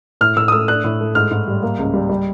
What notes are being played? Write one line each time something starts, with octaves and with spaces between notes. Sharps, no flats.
A2 F6
A2 E6
D#6
A3 E6
D4 F#6
A2
A3
G#2 F6
G#2
G3
A#3
C#2
G3
G3